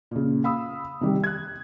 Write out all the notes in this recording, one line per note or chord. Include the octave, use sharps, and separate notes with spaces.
A#2 C#3
F5 B5 D#6 E6
C3 D#3 G3
F#6 G#6